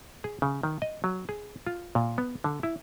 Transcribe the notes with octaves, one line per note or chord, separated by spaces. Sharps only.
G#4
C#3
D#3
D#5
F#3
G#4
F4
A#2
B3
D3
E4